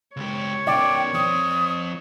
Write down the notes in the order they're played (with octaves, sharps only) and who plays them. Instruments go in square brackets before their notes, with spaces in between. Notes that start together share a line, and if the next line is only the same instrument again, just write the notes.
[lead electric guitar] C#2 G4 [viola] C#5
[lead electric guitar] B2 D#3 [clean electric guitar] D5 [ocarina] G5
[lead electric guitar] F3 C4 [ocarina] D#6